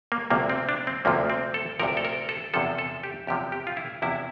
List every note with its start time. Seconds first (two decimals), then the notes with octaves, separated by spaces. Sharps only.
0.12 A#3
0.30 D2 C3 F3 A#3
0.50 C4
0.69 D4
0.87 C4
1.05 D2 C3 F3 A#3
1.30 C4
1.54 A4
1.79 D2 C3 F3 A#4
1.97 A4
2.05 A#4
2.29 A4
2.54 E2 C3 F3 A4
2.78 A4
3.03 G4
3.27 E2 C3 F3 G4
3.52 G4
3.67 F4
3.77 E4
4.02 E2 C3 F3 E4